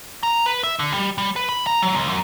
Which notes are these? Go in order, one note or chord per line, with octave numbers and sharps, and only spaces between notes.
A#5
B4
E5
D3
G3
G3
B4
B5
A#5
F#3
C#2
F#2